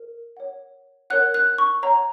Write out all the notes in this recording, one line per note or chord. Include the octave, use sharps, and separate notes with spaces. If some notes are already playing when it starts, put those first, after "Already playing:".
Already playing: A#4
C#5 F#5
A#4 C#5 F#5 F#6
F#6
C#6
C#5 F#5 A#5